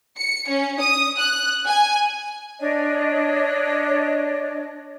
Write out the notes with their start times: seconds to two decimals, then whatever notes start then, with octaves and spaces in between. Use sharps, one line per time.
0.18 C#7
0.49 C#4
0.80 D#6
1.19 F#6
1.68 G#5
2.58 D4 C#5 D#5